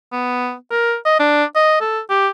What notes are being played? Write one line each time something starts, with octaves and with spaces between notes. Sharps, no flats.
B3
A#4
D#5
D4
D#5
A4
G4